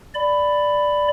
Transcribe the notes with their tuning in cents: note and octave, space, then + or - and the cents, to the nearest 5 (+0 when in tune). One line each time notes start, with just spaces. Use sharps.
D5 +0 B5 +10